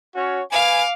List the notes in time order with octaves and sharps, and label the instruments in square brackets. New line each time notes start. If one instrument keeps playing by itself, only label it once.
[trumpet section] C#4 F#4 C#5
[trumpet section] B4 G#5 [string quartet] F5 D6